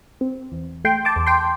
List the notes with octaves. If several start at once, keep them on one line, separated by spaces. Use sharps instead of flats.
C4
E2
A3 G5 C6
A5 D6
E2
G5 C6